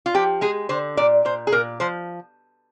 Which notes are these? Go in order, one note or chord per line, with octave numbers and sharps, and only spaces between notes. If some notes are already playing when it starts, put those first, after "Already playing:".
F4
F3 G4
G#3 G#4
D3 C5
A#2 D5
A#2 C5
G#4
A#2 A#4
F3 C5